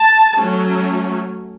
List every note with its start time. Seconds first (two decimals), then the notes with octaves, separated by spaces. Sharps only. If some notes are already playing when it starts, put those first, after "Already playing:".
Already playing: A5
0.38 F#3 A3 C#4